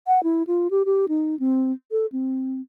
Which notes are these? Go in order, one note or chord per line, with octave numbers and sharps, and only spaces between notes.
F#5
E4
F4
G4
G4
D#4
C4
A4
C4